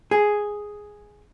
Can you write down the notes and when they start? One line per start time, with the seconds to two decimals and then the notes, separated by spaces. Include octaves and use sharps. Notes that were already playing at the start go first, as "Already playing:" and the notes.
0.11 G#4